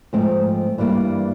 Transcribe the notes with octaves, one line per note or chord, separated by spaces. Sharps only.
G#2 F3 A3 C4
G2 E3 G3 A#3